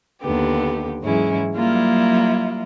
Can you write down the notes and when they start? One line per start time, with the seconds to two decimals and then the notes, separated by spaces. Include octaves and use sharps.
0.21 D#2 D3 B3 G4
1.02 G#2 E3 F#3 G#3 C#4 E4
1.56 F#3 G3 A#3 E4 F4